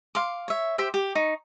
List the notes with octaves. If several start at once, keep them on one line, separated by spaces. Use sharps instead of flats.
F5 C6 D6
C#5 E5
G4 C5 E5 G5
G4
D#4 C#6